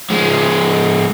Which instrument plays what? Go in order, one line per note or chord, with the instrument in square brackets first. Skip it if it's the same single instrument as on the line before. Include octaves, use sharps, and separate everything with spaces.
[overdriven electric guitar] F3 G#3